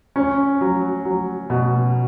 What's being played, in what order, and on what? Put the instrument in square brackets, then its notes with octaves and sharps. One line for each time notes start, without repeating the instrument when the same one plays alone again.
[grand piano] C#4
F#3
F#3
B2